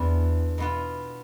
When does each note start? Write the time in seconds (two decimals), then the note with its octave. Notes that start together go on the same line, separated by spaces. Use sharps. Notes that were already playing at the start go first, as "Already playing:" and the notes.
Already playing: E2 E3 B3 D4 F4
0.58 B2 B3 F4